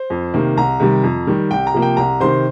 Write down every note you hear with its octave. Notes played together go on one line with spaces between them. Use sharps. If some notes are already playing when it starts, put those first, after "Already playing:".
Already playing: C5
F2
C3 D#3 A#3
C2 A#5
C3 D#3 G3
F2
D#3 G3
C2 G5
A#5
C3 F3 A#3
G5
C2 A#5
C3 D#3 C5 C6